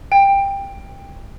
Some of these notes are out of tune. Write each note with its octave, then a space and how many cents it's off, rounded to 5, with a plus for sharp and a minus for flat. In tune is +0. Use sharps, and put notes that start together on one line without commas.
G5 +15